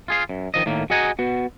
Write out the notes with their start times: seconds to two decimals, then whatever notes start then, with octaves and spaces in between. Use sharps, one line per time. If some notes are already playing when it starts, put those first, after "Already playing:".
0.08 F4 G#4 F5
0.29 F#2
0.54 D#3 F3 D#5
0.66 A2 D#3 A#3
0.90 F#4 G#4 D#5 F#5 G#5 A#5
1.19 B3 F#4